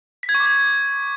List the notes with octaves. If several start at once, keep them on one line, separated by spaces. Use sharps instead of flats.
B6
G#6
C#6
D6
G#6